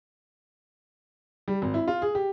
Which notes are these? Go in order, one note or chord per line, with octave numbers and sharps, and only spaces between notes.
G3
G#1
E4
F4
G#4
G4